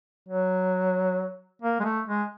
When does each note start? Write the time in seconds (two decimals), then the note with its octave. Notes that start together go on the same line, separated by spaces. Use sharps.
0.29 F#3
1.62 A#3
1.80 G#3
1.84 A3
2.08 G#3